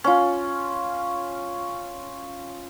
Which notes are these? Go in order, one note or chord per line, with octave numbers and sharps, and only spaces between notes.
C#4 F4